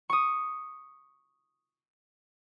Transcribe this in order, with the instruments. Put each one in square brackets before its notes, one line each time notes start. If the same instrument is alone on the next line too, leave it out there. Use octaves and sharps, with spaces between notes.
[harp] C#6 D#6